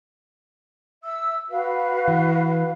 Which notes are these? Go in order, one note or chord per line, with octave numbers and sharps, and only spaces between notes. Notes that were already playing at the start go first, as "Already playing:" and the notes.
E5 E6
F#4 B4 F5
E3